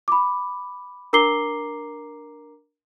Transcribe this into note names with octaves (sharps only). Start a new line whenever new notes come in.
B5 D6
D4 A#4 A#5 D6 C7 G7